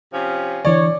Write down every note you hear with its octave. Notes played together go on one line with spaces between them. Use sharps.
C3 F3 C#4
D3 E3 D4 C#5 D5